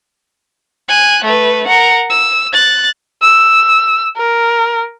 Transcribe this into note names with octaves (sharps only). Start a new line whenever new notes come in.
G#5 F#6
A3 B4
A#4 F#5
E6
F#6 A6
E6
A#4